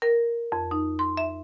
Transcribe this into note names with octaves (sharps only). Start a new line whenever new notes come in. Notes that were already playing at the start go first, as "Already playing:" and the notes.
A#4
F2
D#4
C6
E5